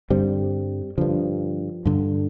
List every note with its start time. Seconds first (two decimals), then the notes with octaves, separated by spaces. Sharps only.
0.10 G2 D3 G3 C4
0.98 G2 D3 F3
1.86 G2 D3